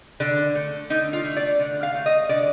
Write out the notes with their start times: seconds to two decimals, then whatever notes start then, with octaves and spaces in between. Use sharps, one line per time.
0.20 D3 D4
0.55 A3
0.90 D3 D#4
1.13 F4
1.25 A3
1.37 D5
1.59 D3
1.83 F5
1.94 A3
2.06 D#5
2.29 D3 D5